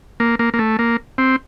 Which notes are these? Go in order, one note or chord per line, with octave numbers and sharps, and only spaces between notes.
A#3
A#3
A#3
A3
A#3
C4